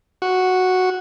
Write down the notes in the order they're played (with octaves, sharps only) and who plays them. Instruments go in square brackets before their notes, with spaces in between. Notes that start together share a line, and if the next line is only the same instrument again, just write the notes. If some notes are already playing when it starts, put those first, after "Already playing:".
[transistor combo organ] F#4